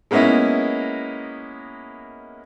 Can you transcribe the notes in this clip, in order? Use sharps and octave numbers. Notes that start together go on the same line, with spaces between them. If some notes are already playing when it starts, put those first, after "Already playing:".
G#3 A#3 B3 C#4 D#4 E4